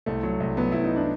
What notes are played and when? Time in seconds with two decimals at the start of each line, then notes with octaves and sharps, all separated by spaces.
0.06 C2 A3
0.23 F#3
0.40 C2
0.57 F#3 B3
0.72 C2 E4
0.84 D#4
0.96 D4